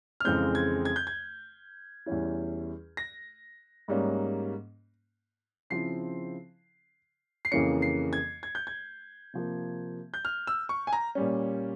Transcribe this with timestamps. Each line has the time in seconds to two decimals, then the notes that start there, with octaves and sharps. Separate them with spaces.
0.20 F6
0.25 F2 C#3 E3 G#3 C4 G6
0.55 G#6
0.85 G#6
0.96 G6
1.07 G#6
2.06 E2 E3 G3 C#4 E4
2.97 A#6
3.88 G#2 G3 A#3 C#4
5.70 C#3 F3 C4 E4 C7
7.45 C7
7.52 F2 C#3 E3 A#3 C#4 C#7
7.82 C7
8.13 G#6
8.43 G#6
8.55 G6
8.67 G#6
9.34 C3 F3 A#3
10.14 G6
10.25 F6
10.47 E6
10.69 C#6
10.87 G#5
10.93 A#5
11.15 A#2 G3 C#4